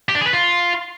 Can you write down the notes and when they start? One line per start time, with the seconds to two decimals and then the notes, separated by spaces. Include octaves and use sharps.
0.09 G4
0.15 D4
0.21 G#4
0.27 B4
0.33 F4